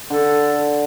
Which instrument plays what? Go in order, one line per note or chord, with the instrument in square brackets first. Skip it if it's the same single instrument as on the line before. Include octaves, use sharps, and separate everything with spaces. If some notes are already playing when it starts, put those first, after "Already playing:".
[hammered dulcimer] D3 [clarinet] A4